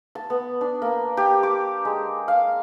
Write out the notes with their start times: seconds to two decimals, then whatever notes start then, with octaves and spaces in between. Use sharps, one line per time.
0.15 A5
0.30 B3
0.61 D4
0.82 A#3
1.17 G4
1.43 D6
1.85 G#3
2.28 F5